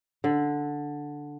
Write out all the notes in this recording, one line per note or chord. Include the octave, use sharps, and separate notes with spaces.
D3